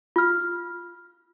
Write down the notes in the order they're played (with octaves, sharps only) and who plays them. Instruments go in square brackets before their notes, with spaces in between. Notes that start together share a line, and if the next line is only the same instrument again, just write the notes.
[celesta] F4 F6